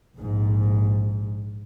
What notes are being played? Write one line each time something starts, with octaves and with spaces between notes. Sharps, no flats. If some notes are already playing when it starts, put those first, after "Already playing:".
A#1 G#2